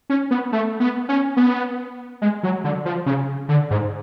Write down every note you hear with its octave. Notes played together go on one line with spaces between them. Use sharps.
C#4
B3
A3
B3
C#4
B3
G#3
F#3
D3
F3
C#3
D3
G#2